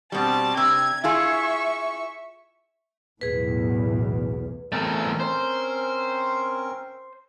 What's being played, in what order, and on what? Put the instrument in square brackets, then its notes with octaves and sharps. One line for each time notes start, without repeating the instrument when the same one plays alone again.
[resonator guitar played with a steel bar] B2 G3 [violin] C4 A5
[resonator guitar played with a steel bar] C3 [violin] G#6
[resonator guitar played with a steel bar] E4 F4 G#4 [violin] E5 C#6
[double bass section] B1 E2 A2 [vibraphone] G#4 B4
[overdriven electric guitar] E2 A3 [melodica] C4 C#4 A#4
[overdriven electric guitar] C5